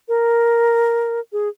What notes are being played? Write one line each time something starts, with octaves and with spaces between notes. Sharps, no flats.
A#4
G#4